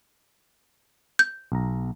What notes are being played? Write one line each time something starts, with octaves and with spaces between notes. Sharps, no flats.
G6
B1 A#5